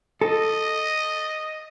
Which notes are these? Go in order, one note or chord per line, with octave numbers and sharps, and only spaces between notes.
A4 D#5